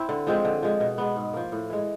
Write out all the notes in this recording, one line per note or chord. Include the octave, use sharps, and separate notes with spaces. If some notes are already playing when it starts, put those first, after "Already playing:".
Already playing: C4 E4
D3
F3 G#3 C4
D3
F3 G#3
B2
G#3 B3
G#2
F3 A#3
A2
E3 G#3